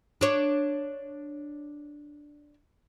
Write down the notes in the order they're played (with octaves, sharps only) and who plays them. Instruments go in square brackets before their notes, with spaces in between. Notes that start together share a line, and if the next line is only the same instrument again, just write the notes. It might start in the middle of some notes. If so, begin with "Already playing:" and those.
[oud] D4 C#5